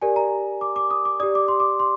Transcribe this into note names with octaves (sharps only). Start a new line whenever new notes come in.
G4 A#4 D5 G#5
A#5
D6
D6
D#6
D6
G4 D5 D#6
D6
C6
D6
C6